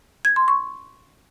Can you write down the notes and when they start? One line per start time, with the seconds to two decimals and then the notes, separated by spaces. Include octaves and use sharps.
0.25 G#6
0.36 C6
0.48 C#6